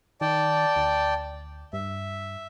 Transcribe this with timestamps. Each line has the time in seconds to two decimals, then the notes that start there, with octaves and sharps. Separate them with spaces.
0.21 D#3 D5 G5 A5
0.76 D2
1.73 G2 E5